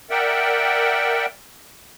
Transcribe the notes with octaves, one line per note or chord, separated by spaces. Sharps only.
A#4 D5 E5 F#5 G5